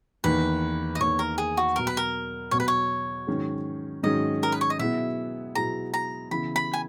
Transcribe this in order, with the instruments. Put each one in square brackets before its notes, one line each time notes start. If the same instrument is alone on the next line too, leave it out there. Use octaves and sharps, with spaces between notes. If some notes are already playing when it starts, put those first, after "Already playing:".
[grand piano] E2 D#3 A#3 [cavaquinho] B4
[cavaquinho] D#5
[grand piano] E2 D#3 A#3 [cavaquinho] C#5
[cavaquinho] A#4
G#4
F#4
[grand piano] B2 F#3 B3 [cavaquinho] A#4
[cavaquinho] B4
A#4
[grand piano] B2 F#3 B3 [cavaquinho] C#5
[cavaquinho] B4
C#5
[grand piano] G#2 D#3 F#3 C#4 G#4
[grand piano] G#2 D#3 F#3 C#4 G#4 [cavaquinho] D#5
[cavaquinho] A#4
B4
C#5
D#5
[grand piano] B2 F#3 B3 E4 G#4 [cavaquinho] E5
[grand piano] B2 F#3 B3 E4 G#4 [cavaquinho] A#5
[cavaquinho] A#5
[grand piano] C#3 E3 B3 E4 [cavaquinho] B5
[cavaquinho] B5
G#5